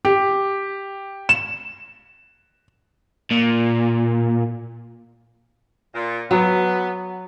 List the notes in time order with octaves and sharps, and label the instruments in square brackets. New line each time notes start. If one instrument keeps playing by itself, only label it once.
[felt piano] G4
E7
[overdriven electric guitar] A#2
[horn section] A#2
[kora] F#3 [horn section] B3